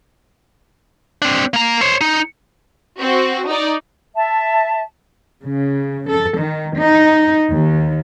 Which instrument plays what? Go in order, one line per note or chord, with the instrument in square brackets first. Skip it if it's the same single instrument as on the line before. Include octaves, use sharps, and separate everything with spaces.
[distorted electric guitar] C4 D4
A#3 A#5
C5 C#5
D#4
[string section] C4 F#4
D#4 D5
[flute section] E5 A5
[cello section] C#3
A4
D#3
D#4
D#2